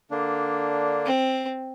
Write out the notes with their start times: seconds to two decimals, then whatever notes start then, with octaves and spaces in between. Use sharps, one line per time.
0.11 D3 A#3 D4
1.06 C4